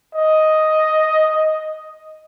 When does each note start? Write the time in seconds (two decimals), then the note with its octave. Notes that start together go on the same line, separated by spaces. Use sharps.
0.15 D#5